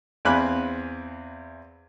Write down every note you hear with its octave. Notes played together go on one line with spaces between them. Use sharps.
E2 C4 F5 G#5 B5 F#6